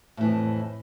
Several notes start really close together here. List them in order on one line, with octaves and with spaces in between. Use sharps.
A2 E3 F2